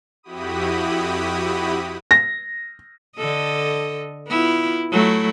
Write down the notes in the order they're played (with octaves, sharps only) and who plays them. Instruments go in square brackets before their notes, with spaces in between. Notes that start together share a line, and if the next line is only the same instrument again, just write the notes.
[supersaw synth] F2 E4 F#4 G4 B5 D#6
[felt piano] A#6
[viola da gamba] D3 A4 D#5
B3 E4 F4
F#3 A3 E4